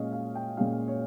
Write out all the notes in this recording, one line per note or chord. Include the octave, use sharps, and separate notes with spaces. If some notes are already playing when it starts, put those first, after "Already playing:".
Already playing: A#2 G#3 C#4 D#5 F5
F5
G5
A#2 G#3 C#4 F5
C#5